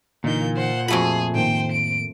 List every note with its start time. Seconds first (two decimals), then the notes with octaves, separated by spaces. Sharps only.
0.24 A#2 D3 E3 A#3 D#4 G6
0.56 C5 F#5
0.88 F2 A3 F4 F#4 G#4 B5
1.35 A2 D#3 A#3 C5 G5
1.72 D7